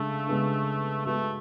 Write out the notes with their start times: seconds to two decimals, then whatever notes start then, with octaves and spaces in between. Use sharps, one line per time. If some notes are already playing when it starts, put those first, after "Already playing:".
Already playing: C#3 G#3 A3 D4
0.26 C#3 G#3 B3 D4
1.05 G#3 A3 B3 F#4